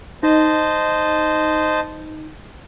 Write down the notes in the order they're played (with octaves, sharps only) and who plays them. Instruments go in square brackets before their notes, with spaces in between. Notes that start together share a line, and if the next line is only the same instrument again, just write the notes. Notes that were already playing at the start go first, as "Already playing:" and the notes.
[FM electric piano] D#4 [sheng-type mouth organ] C5 D#5 A5